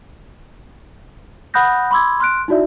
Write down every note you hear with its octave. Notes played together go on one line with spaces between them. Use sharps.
F#5 B5 D#6 F#6 G6 A#6
B5 C6 D6 E6 G#6
C6 F6 F#6 D7
D#4 E4 F#4 D5 E5